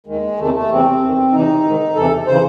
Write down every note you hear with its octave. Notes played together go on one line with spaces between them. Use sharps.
D#2 D#3 G#3
E2 C3 D#3 A3
A3
E2 C3 E3 C4
E2 D#3
E2 C3 E3 D#4
G#2 D#3
E2 C3 E3 A4
C#3 E3 C5